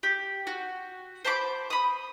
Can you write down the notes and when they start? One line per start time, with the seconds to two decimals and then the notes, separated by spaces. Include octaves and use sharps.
0.03 G4
0.47 F#4
1.25 C5 A5 B5 D6
1.70 B5 D#6